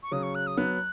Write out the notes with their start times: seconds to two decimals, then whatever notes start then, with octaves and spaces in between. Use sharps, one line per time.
0.03 C#6
0.11 C#3 F#3 D#6
0.23 C#6
0.35 F#6
0.47 D#6
0.57 F#3 B3 F#6